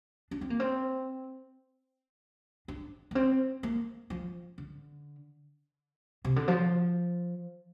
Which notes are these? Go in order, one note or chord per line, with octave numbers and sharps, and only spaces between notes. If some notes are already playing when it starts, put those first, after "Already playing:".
D4
C4
A#3
C4
D4
A#3
C4
A#3
F3
D3
C3
D3
F3